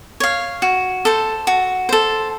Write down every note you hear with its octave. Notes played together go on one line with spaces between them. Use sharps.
C#5 F5
F#4
A4 C5
F#4
A4 C5